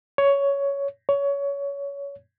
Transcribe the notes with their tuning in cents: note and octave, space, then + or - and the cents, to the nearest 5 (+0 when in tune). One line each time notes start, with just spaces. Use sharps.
C#5 +10
C#5 +20